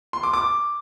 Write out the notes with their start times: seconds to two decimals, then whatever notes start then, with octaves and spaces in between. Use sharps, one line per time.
0.13 C6
0.23 D6
0.34 D6